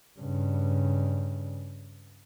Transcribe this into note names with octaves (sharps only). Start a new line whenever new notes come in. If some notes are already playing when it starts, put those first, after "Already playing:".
G2 C#3